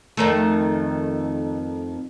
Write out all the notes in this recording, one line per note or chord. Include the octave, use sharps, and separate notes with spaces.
F2 D#3 A3